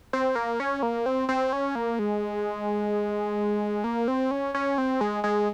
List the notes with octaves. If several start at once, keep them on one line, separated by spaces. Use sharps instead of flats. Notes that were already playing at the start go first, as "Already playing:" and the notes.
C4
A#3
C#4
A#3
C4
C4
C#4
A#3
G#3
A#3
C4
C#4
C#4
C4
G#3
G#3